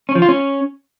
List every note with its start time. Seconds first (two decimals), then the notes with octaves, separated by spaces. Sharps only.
0.09 C#4
0.15 F3
0.22 F4
0.29 C#4